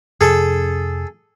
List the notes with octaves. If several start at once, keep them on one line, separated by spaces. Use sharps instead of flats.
F2 C3 C4 G#4 A4